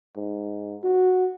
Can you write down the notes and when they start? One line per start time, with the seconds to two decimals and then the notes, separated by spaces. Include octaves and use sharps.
0.16 G#2
0.84 F#4